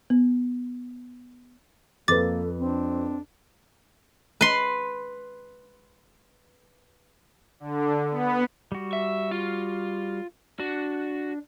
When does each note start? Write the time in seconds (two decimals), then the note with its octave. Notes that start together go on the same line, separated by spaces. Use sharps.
0.10 B3
2.08 F2 A#3 A4 B4 D6 A6
2.59 C4 D4
4.41 B4 C6
7.60 D3
8.11 B3
8.72 G3 F#4
8.93 E5
9.31 F4
10.60 D4 F#4